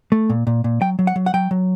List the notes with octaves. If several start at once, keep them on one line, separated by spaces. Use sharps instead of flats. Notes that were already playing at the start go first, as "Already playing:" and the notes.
A3
A#2
A#2
A#2
F#3 G5
F#3
F#5
F#3
F#5
F#3 G5
F#3